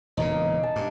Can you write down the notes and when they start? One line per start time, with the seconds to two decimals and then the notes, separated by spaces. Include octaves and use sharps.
0.17 E1 A#2 C#3 D#4
0.31 A#3
0.63 A5
0.76 G2